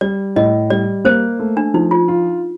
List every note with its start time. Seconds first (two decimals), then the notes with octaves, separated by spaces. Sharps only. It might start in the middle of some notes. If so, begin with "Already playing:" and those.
0.01 G3 D5
0.36 A2 D#5
0.70 G3 D5
1.05 A#3 C5
1.39 A3
1.57 D4
1.74 F3 D#4
1.91 F4
2.08 F4